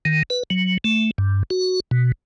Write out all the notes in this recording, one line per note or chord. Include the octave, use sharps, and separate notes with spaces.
D#3
B4
F#3
A3
G2
F#4
B2